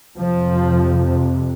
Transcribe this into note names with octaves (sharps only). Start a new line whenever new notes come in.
F2 C3 F3